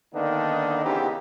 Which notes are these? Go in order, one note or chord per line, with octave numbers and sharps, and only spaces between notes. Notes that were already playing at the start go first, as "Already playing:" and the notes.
D3 D#3 A#3 B3 D4 D#4
C#3 E3 B3 C4 D#4 G4